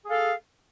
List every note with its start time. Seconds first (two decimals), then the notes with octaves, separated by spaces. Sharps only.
0.05 G#4
0.08 F5
0.11 A4